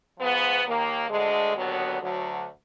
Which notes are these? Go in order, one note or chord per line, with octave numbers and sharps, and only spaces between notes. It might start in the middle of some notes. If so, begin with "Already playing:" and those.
G#2 F3 B3
D#2 D#3 A#3
D2 D3 G#3
D#2 D3 F#3 B3
D2 D3 F#3